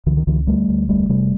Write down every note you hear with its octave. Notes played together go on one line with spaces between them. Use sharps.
C#2 D3 E3
D#3
C#2 D3 E3
D2 G3 A3
D2
F1 G3 A3
C3 G3 A3